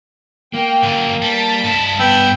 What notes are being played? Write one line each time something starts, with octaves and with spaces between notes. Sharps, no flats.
A#3 G5
F#2 D3
G3 A5 A6 B6
G2 E4
B3 G5 B5 E6